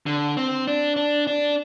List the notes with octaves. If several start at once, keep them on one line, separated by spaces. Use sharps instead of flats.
D3
C4
D4
D4
D4